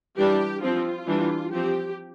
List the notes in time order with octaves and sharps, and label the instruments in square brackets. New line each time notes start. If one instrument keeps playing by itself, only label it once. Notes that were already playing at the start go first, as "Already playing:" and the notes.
[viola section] E3 G3 D4 G4
F3 C4 F4
E3 G3 D4
F3 C4 G4